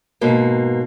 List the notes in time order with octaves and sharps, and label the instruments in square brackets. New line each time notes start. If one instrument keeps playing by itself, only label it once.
[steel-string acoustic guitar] G#2 B2 A#3